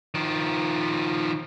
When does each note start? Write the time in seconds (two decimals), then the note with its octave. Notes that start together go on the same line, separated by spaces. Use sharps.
0.14 D#3 F3